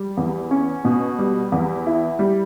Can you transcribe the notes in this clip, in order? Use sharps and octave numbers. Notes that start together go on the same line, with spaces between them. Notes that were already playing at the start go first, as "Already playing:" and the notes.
Already playing: G3
E2
C#4
B2
G3
E2
E4
G3